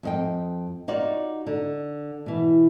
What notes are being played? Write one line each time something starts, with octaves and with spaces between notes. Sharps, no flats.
F2 D#5 G5
D#4 F4 F#4 C#5 D5
D3
B2 E3